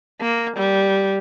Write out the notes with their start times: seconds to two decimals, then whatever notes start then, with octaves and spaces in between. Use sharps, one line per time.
0.21 A#3
0.57 G3